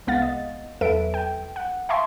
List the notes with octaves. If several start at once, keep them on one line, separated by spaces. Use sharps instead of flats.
C2 G#3 B3 F5 F#5 A6
D#5
E2 F#3 A4 B4 E5 D7
G5
F#5
E5 F5 G#5 A5 C6 C#6